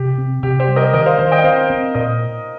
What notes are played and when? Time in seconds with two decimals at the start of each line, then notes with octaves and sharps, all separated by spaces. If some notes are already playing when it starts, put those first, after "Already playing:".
Already playing: C3 G4
0.18 C4
0.43 C3 G4
0.60 G4 C5
0.68 G3
0.76 A#4 D#5
0.93 D#3 A#4 D#5
1.06 C5 F5
1.18 D#3 C5 F5
1.32 D#5 G5
1.44 C4 C5 F5
1.70 C4
1.95 A#2 A#4 D#5